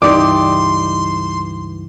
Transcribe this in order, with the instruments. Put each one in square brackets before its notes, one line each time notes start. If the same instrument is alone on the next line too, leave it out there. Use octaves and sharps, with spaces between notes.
[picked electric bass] C#2 G2 E3 [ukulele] D#4 G4 D5 [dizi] C6 [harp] D6